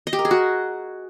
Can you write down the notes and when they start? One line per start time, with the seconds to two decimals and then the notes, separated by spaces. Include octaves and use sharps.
0.07 D#5
0.13 G4
0.19 A#4
0.25 G#4
0.31 F#4